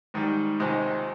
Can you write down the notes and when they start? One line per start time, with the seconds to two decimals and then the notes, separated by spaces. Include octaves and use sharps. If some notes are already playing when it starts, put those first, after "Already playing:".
0.14 G#2 D#3 G3
0.60 C#2 C3 D#3 G#3 D#4